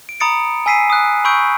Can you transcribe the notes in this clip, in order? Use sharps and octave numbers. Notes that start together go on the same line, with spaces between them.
D7
A#5 B5 D#6 A6 C#7 D7
G#5 E6 B6 C7 D#7
D#6 F#6
B5 C#6 E6 G6 D7